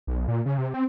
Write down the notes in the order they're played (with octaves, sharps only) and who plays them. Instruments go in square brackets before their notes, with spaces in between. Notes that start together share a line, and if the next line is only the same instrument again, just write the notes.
[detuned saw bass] B1
A#2
C#3
C3
C4